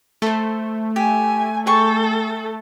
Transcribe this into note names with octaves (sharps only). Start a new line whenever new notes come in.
A3 A4 C5
G4 G#5
G#4 A4 G5 C#6